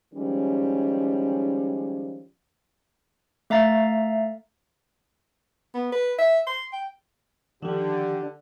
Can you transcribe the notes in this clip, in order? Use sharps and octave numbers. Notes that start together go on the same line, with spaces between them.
D#3 F3 G3 G#3 C#4
A3 E5 F5 A#5 A6
B3
B4
E5
C6
G5
D3 D#3 F3 D4 G4